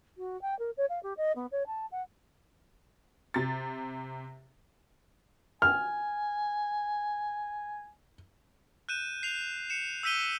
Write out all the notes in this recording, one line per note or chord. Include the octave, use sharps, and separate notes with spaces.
F#4
G5
A#4
C#5
F5
G4
D#5
B3
C#5
A5
F#5
C3 A6
G#5 F6
F#6 G6 D#7 E7
C7 F7
C#7 E7
E6 G6 B6 D#7 G7